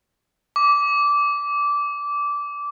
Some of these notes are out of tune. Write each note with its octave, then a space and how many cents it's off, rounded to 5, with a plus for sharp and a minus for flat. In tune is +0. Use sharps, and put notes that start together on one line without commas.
D6 -15